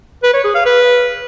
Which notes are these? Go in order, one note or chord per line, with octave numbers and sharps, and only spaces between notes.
B4
C#5
G#4
F5
B4